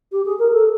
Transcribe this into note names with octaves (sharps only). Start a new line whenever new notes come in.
G4
G#4
A#4
A4